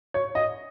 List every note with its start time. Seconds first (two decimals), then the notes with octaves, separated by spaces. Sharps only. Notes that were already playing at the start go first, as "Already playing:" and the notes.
0.14 C#5
0.35 D#5